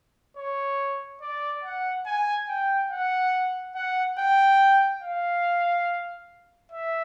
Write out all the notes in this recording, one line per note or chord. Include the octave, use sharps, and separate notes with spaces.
C#5
D5
F#5
G#5
G5
F#5
F#5
G5
F5
E5